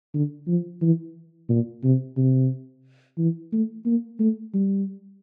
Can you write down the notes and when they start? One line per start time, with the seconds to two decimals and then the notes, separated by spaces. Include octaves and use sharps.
0.14 D3
0.47 F3
0.82 E3
1.49 A#2
1.84 C3
2.17 C3
3.18 E3
3.53 A3
3.86 A#3
4.20 A3
4.54 G3